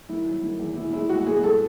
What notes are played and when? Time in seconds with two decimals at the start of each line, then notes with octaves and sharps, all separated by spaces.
0.09 D#3 E4
0.26 F#3
0.43 D#3
0.59 E2
0.76 B2 E4
0.93 G#3 E4
1.09 G#3 F#4
1.27 B2 G#4
1.43 G#3 A4